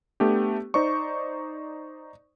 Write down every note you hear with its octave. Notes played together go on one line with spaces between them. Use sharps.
A3 B3 D4 G4
D#4 C5 D5 C#6